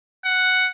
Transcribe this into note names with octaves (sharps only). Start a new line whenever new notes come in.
F#5